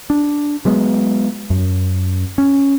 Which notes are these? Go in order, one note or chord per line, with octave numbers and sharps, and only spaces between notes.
D4
F#3 G#3 B3
F#2
C#4